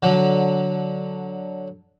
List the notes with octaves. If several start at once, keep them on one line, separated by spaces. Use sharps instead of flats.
D3 F#3